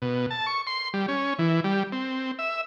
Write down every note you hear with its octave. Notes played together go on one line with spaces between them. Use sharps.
B2
A5
C#6
C6
G3
C#4
E3
G3
C4
E5